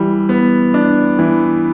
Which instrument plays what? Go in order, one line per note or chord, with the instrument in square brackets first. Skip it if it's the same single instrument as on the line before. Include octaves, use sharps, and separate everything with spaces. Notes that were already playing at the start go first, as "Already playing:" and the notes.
Already playing: [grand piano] E3 G3
B3
D4
E3